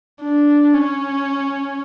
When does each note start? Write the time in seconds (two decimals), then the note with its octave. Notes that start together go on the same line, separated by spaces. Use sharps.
0.22 D4
0.74 C#4